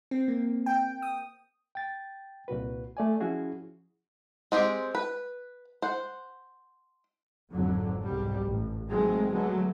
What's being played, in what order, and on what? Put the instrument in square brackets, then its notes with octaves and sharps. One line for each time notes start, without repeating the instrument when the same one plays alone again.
[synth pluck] C4
A#3
G5
D#6
[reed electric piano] G5 A6
C2 A#2 F#4 B4
A3 D5 G#5
F3 C#4 E4 F#4 G#4
[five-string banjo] G#3 C4 G4 G#4
B4
C5 F#5
[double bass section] G#1 F2 D3 F#3
C2 G#2 B2 G3
A1
D#3 E3 F#3 G#3 A3 C4
D3 F#3 G#3 A3 B3